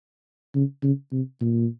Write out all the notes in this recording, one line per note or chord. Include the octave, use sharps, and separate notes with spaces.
C#3
C#3
C3
A#2